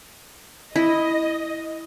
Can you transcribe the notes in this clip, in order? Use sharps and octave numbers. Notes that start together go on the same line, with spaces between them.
E4 D#5